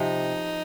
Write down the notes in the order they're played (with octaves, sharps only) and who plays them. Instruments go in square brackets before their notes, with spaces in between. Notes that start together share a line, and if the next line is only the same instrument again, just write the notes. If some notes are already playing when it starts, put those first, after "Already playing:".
Already playing: [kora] C3 F3 [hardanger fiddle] D#4